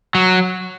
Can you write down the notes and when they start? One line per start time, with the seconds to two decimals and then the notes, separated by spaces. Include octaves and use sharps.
0.15 F#3